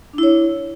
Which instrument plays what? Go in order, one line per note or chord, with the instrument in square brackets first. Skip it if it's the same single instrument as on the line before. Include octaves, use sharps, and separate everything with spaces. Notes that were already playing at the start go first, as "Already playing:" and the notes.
[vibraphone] D4
E4
C#5